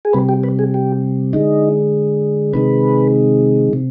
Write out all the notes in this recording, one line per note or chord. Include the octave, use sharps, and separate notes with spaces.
G#4
C3 G3 B4
G4
B4
G#4
G4
D3 G#3 D#4
C3 D#3 G#3 B4
C3